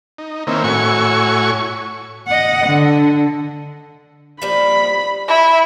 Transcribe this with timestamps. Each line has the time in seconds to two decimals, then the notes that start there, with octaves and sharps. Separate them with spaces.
0.18 D#4
0.47 D#3 A#3 C4 C#4 E4
0.64 A2 E4 F#4 C#5 G#5 C#6
2.27 D#5 F#5
2.67 D3
4.42 F3 G3 A#3 B5
5.28 E4